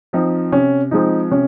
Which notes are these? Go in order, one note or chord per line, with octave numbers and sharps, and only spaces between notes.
F3 C4 D#4
C3 C#4
F3 G#3 C4 D#4
C3 C#4